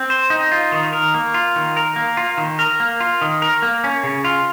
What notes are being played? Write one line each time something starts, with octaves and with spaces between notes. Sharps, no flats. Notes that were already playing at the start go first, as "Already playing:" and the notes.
Already playing: C4
C5
D#4
F4
D#3
A#4
A#3
F4
D#3
A#4
A#3
F4
D#3
A#4
A#3
F4
D#3
A#4
A#3
C#4
C#3
F4